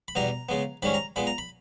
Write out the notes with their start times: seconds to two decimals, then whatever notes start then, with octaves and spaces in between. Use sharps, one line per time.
0.08 B5
0.15 E2 B2 G3 B3 A#5
0.49 C#3 G#3 B3
0.82 G#2 D#3 G3 C#4 B5
0.94 A#5
1.16 A#2 G#3 B3 B5
1.27 A#5
1.38 B5